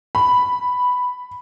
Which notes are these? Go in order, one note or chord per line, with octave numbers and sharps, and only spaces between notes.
B5